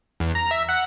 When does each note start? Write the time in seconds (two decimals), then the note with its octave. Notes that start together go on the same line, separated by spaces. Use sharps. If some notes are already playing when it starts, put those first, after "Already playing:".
0.20 E2
0.35 A#5
0.51 E5
0.69 F#5